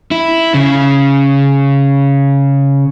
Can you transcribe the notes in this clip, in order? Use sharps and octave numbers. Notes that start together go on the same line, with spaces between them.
E4
C#3